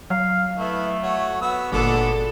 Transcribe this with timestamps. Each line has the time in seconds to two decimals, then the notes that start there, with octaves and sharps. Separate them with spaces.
0.10 F#3 F5
0.57 A3 B3 E4
1.03 F#4 C#5
1.41 B3 F#4 E6
1.72 G1 A#2 G#3 A#3 D4 F#4 A4